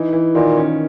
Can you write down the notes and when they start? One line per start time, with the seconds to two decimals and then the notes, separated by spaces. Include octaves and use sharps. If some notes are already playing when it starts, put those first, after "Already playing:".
Already playing: E3 D#4
0.13 E3
0.35 A#2 D#3
0.57 C#4